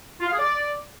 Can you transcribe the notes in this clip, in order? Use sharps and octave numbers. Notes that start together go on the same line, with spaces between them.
F4
F5
G#4
D5